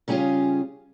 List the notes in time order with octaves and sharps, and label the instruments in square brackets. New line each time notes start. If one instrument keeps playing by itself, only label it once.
[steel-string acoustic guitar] C#3 G3 C#4 D4 F4 G#4